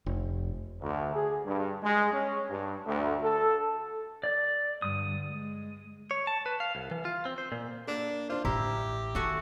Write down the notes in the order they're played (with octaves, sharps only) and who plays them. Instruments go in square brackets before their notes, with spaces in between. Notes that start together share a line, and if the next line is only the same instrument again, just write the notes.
[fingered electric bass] F1
[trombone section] D2
G#4
G2
G#3
C#4
G2
D2
A4
[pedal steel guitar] D5
[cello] G2 D3 [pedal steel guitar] D#6
[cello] G#3
[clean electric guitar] C#5
A5
B4
F5
C2
E3
F4
C4
C5
A#2
[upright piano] A#3 [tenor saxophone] D4
[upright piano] D4 C5 [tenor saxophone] F4
[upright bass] A1 [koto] E4 [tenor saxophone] G4 [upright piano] A#5
[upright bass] D#3 [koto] A3 F#4 G#5